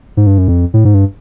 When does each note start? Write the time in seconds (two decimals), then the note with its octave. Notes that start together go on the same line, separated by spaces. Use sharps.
0.17 G#2
0.27 G2
0.38 F#2
0.48 F2
0.74 A2
0.85 G#2
0.94 G2